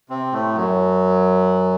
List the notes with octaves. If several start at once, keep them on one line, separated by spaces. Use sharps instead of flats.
C3 C4
A2 A3
F#2 F#3